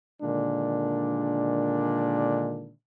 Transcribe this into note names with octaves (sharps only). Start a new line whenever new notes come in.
A#2 D3 D#3 G#3 D4